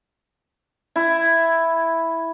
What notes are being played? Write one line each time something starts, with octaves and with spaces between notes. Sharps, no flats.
E4